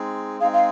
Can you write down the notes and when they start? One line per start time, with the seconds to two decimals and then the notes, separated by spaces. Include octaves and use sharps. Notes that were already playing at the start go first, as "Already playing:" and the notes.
Already playing: G#3 C4 D#4 G#4
0.40 G#3 C4 D#4 G#4 F5
0.53 F5